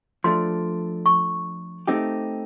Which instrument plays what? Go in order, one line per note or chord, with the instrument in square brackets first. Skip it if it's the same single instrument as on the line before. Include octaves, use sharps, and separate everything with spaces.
[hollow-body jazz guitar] F3 A3 D4 [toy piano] C6
[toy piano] C#6
[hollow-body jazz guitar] A3 C4 D#4 G4